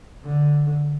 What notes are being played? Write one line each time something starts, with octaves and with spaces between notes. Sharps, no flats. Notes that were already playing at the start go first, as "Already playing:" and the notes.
D3